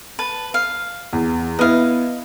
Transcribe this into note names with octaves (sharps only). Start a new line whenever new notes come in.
B4 A5
F5
E2
B3 E4 D#5 F5